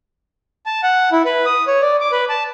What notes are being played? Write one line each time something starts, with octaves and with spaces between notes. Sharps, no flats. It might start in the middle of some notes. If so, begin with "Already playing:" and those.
A5
F#5
E4
B4
D#6
C#5
D5
D6
B4
A5